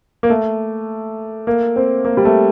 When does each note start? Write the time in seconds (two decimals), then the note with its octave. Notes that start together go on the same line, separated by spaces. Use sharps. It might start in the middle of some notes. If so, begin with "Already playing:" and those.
0.23 A#3
0.30 A3
1.47 A#3
1.76 C4
2.05 A#3
2.17 G3
2.25 A3